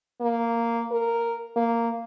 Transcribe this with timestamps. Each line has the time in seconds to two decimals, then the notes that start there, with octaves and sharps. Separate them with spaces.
0.21 A#3
0.92 A#4
1.56 A#3